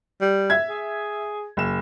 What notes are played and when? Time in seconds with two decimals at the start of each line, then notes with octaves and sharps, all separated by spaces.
0.21 G3
0.50 E5 G#6
0.69 G#4
1.57 F#1 E7